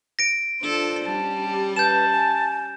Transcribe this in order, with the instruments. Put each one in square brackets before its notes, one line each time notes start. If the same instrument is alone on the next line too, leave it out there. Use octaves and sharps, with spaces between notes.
[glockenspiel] A#6 D7
[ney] D4 [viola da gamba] F4 A4 C5
[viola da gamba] G3 C#4 [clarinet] A5
[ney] G4
[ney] B4 [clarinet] A5 [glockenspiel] G6 E7
[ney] G#5